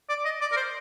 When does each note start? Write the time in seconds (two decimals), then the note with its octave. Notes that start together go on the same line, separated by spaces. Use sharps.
0.09 D5
0.25 D#5
0.41 D5
0.52 A#4
0.57 C5